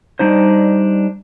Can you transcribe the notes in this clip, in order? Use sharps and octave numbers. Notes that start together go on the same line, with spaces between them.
G3 D4 D#4 C5